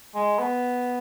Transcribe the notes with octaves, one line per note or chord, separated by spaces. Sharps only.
G#3
B3